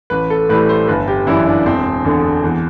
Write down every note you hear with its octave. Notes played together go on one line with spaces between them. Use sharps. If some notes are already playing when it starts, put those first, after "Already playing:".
A1 B4
A4
A2 E3 G3 B4
C5
G1 B4
G4
F#2 E3 G3 E4
D4
E1 C4
E2 D3
E2